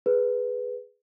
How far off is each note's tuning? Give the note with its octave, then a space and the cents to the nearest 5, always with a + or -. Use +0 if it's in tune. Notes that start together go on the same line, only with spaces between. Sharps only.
G#4 +0 B4 +0